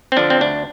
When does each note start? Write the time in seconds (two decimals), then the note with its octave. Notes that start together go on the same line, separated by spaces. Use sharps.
0.12 C4
0.17 D3 F3 D4
0.30 C4
0.41 D2 D4